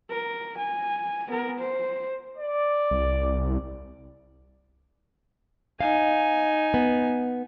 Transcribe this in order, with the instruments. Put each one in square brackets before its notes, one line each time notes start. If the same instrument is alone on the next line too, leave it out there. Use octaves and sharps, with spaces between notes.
[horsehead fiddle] A#4
G#5
B3 A#4
C5
[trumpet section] D5
[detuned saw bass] C2
[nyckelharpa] D#4 G#5 [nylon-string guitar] F5
[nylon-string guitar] B3